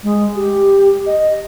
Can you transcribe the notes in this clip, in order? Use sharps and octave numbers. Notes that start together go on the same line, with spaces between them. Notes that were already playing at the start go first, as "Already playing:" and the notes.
G#3
G4
D#5